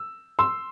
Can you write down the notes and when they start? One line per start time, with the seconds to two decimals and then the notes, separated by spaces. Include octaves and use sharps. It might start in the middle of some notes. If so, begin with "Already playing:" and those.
Already playing: E6
0.39 C6 E6